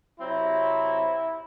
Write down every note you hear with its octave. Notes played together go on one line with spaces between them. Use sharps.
C3 F#3 C4 E4